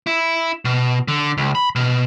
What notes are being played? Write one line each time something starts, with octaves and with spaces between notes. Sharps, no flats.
E4
B2
D3
C#2
B5
B2